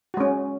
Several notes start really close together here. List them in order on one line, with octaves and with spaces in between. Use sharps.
F#4 G#3 C#4